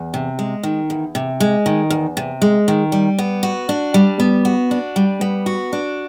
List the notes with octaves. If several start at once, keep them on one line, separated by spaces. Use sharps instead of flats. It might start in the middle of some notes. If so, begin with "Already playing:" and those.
Already playing: E2
C3
G#3
D#3
E2
C3
G#3
D#3
E2
C3
G#3
D#3
G3
B3
F#4
D4
G3
B3
F#4
D4
G3
B3
F#4
D4